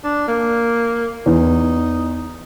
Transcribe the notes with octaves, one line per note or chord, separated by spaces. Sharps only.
D4
A#3
E2 D#4